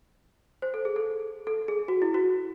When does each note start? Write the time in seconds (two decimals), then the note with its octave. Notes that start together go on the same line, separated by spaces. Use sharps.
0.62 C5
0.74 A4
0.85 G#4
0.96 A4
1.47 A4
1.68 G#4
1.88 F#4
2.02 E4
2.14 F#4